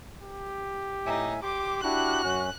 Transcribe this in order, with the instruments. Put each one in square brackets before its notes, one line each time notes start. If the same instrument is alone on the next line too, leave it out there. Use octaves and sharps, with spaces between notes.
[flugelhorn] G4
[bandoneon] A2 E5 G#5 [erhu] D#4
[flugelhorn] G4 [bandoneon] C6 [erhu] D6
[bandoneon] D4 E4 G4 [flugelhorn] F#4 [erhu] F#6
[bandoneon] F#2 C#4